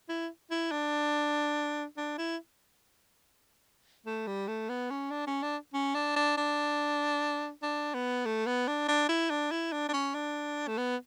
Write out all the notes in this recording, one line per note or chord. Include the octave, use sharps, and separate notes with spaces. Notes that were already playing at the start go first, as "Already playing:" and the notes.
E4
E4
D4
D4
E4
A3
G3
A3
B3
C#4
D4
C#4
D4
C#4
D4
D4
D4
D4
B3
A3
B3
D4
D4
E4
D4
E4
D4
D4
C#4
D4
A3
B3